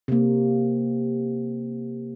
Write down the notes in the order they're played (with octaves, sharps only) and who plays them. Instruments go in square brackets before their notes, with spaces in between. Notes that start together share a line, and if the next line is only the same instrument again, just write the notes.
[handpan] C3 A#3